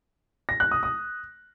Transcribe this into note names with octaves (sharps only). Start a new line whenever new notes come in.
A#6
F#6
D#6
D#6